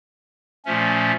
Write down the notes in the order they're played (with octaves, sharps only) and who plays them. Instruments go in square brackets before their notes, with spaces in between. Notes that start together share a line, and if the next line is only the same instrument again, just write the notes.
[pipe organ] A#2 F3 A3 C#4